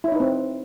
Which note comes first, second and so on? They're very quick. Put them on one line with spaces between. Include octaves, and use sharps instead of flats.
E4 C#5 D#4 B4 C4